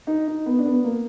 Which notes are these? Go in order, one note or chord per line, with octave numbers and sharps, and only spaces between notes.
D#4
D#4
B3
D4
B3
A#3